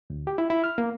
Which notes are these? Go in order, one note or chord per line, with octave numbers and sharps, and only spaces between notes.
D2
G4
E4
E4
F6
A#3